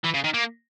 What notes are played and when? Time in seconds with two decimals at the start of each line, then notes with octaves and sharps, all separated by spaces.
0.04 E3
0.14 C#3
0.24 D#3
0.34 A#3